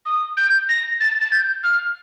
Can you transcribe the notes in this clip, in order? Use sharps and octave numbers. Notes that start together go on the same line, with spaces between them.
D#6
G6
A#6
A6
A6
G6
F6